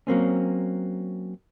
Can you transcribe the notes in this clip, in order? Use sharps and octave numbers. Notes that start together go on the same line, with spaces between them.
F#3 A#3 C4 C#4